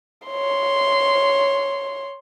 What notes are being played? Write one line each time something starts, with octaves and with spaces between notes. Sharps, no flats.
C#5 C6